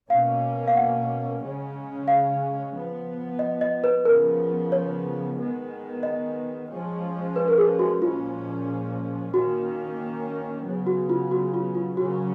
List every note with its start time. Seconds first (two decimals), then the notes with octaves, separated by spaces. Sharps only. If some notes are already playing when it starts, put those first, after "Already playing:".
0.10 B2 A#3 C#4 F5
0.68 F5
0.76 F#5
1.41 C#3 G#3 C#4
2.08 F5
2.74 F3 B3
3.39 D#5
3.61 D#5
3.84 B4
4.05 C#3 F3 B3 A#4
4.72 C#5
5.38 D#3 G#3 B3
6.03 D#5
6.69 F3 G#3 C#4
7.36 B4
7.48 A#4
7.58 G#4
7.79 F#4
8.01 A#2 F3 G#3 C#4 F4
9.33 D#3 A#3 C#4 F#4
10.65 C#3 F#3 B3
10.87 F#4
11.10 F4
11.31 F#4
11.54 F4
11.75 F4
11.97 C#3 F#3 A#3 C#4 F#4